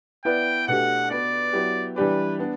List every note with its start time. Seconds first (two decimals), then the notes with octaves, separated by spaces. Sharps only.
0.25 B3 E4 B4 D5 G5
0.67 B2 A3 D4 G4 F#5
1.11 B3 F#4 B4 D5
1.53 F#3 B3 E4 G4
1.96 E3 G3 D4 G4 B4 D5
2.39 B3 D4